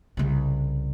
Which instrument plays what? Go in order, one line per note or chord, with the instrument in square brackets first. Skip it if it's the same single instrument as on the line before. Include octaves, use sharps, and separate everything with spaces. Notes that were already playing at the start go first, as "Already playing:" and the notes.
[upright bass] C2 C#3